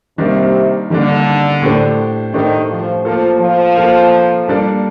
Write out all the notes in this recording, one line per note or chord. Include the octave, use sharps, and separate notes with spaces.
C3 D#3 G3 A#3 D4
D3 D#3 G3 A#3 D4
A2 A3 D4 G4 C5
A2 D#3 A3 D4 G4 C5
F3
F3 A#3 F4 A4
F3
A#3 F4 A4
G3 A#3 D4 A4 D5